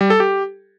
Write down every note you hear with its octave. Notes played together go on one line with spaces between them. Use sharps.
G3
A4
G4